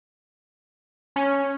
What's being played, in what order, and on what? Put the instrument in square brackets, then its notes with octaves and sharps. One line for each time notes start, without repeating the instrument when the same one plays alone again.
[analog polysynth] C#4